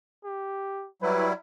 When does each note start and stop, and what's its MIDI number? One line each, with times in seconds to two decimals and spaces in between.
0.24 0.87 67
1.02 1.33 54
1.02 1.33 55
1.02 1.33 64
1.02 1.28 71